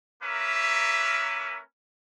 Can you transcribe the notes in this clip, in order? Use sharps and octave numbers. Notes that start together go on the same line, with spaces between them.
A#3 C#4 A#4 B4 E5